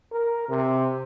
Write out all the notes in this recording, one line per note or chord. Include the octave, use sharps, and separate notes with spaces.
A#4
C3